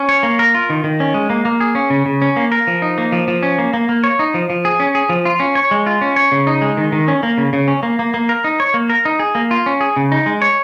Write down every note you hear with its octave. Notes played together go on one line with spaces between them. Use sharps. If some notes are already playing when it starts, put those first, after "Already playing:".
Already playing: C#4
C#5
A#3
A#4
F4
D#3
D#3
C#4
G#3
A#3
A#3
G#4
C#4
C#3
C#3
C#4
A#3
A#4
F3
D#4
A#3
F3
F3
C#4
A#3
A#3
A#3
C#5
D#4
F3
F3
G#4
C#4
G#4
F3
F4
C#4
C#5
G#3
F4
C#4
C#5
C#3
D#4
G#3
D#3
D#3
C#4
A#3
C#3
C#3
C#4
A#3
A#3
A#3
A#4
D#4
C#5
A#3
A#4
D#4
G#4
A#3
F4
C#4
G#4
C#3
D#4
G#3
C#5